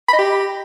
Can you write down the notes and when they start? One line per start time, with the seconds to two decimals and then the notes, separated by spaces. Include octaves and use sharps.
0.08 B5
0.13 D#5
0.18 G4